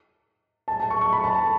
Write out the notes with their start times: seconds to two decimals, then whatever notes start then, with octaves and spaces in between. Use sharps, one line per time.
0.68 A5
0.80 A5
0.90 C#6
1.01 C#6
1.13 B5
1.24 A5
1.35 A5